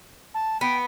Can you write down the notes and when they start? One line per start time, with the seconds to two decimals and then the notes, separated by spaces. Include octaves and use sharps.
0.34 A5
0.61 B3 G5